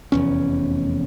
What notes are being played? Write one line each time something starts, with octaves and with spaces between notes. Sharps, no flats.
F1 E2 C#4